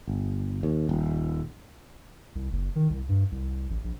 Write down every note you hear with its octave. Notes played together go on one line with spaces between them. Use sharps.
G1
D#2
D#1
C2
F#1
D#3
C2
G2
C2
A1
A#1